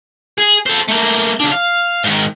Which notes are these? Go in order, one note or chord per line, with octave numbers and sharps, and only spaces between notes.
G#4
A4 C5
A3 A#3
C#3 D4
F5
G#2 D#3